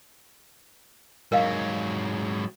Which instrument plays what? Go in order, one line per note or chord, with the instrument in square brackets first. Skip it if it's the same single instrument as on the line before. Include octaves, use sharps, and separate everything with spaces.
[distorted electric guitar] G#2 F#3 [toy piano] A#4 D#5 F5